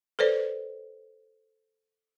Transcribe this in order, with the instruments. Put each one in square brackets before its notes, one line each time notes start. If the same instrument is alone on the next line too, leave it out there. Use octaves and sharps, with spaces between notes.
[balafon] A4 B4 C5 D5